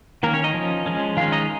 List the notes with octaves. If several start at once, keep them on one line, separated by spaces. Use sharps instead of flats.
D#3 A#3 C#4 A#4
C#4 C#5
D#4 D#5
F3 C#4
F3 G#3 C#4
D#3 G#3 C#4 F4 F5
D#4 D#5